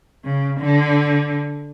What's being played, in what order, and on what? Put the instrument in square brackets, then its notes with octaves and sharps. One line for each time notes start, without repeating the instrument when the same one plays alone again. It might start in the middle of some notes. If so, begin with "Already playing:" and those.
[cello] C#3
D3